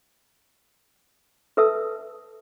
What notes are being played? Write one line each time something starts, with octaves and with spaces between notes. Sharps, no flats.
A4 B4 E5 A5 D#6 E6